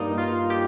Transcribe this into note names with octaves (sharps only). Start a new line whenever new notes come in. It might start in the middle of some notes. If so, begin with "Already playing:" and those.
Already playing: G2 G3 A#3 D#4
F4
G4